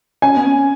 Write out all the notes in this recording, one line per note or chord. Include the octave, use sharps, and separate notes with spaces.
C#4 G#5
B3
C#4